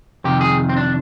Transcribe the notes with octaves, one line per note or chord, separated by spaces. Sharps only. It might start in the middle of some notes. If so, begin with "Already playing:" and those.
F2 C3 D#3 G4
G#4
C4
D4